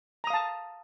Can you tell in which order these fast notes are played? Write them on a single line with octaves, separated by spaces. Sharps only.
A#5 D#6 F5 A5